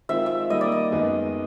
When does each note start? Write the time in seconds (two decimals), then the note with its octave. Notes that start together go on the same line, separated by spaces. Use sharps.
0.09 D#3 G#3 C4 F4 E5
0.26 E5
0.50 D#3 G3 A#3 D#5
0.61 D5
0.72 D#5
0.92 F#2 D#3 G#3 B3